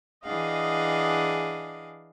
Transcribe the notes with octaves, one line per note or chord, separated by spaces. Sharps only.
E3 D4 G#4 D#5 F5 F#5